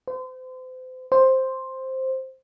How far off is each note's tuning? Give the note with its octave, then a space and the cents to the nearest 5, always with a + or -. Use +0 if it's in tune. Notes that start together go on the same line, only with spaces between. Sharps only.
C5 -35
C5 +5